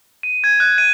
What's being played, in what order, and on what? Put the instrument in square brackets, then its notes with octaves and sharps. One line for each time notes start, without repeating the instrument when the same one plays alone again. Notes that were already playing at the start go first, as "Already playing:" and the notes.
[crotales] D#7
G#6
F#6
D#7